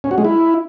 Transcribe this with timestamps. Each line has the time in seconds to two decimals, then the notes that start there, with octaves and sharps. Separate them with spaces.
0.04 C#4
0.11 F#4
0.18 G#3
0.25 E4